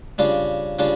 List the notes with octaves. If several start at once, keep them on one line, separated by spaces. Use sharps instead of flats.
C#3 G3 D4 F4
C#3 G3 D4 F4